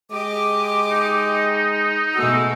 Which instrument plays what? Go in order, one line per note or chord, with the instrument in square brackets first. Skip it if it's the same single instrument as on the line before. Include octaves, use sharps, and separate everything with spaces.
[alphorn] G#3 [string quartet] G4 D#5 [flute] D6
[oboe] D#4
[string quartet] B2 G#3 A3 [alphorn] F#4 [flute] E6